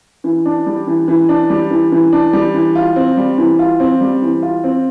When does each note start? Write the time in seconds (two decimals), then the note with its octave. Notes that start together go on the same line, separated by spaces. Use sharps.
0.24 E3
0.46 D4
0.66 G3
0.87 E3
1.08 E3
1.29 D4
1.50 G3
1.71 E3
1.92 E3
2.12 D4
2.33 G3
2.54 E3
2.75 F4
2.96 C4
3.17 G3
3.38 E3
3.59 F4
3.80 C4
4.01 G3
4.22 E3
4.43 F4
4.64 C4